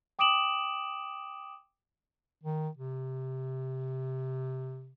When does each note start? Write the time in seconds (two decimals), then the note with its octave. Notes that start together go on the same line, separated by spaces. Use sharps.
0.19 G5 D6 D#6 D7 E7 F#7
2.43 D#3
2.77 C3